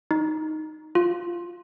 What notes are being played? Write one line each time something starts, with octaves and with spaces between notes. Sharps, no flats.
D#4
F4